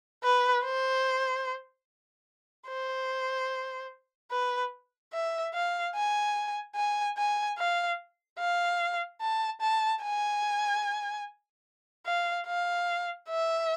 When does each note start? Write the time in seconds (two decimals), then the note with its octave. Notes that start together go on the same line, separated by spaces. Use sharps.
0.24 B4
0.64 C5
2.68 C5
4.31 B4
5.13 E5
5.54 F5
5.95 G#5
6.75 G#5
7.17 G#5
7.58 F5
8.39 F5
9.21 A5
9.61 A5
10.02 G#5
12.06 F5
12.47 F5
13.28 E5